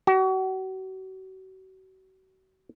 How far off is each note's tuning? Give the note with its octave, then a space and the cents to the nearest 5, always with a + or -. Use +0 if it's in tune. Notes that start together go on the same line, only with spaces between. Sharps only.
F#4 +35